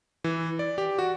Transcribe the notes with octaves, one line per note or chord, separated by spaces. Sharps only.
E3
D5
G4
F#4